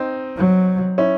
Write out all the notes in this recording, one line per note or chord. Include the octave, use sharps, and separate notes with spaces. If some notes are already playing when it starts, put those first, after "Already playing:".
Already playing: C4 D#4
F#3
C#4 E4